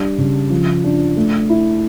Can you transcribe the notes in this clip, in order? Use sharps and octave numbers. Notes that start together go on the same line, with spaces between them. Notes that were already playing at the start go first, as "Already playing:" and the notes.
Already playing: G3 D4
C#3
F3
D4
A3
E4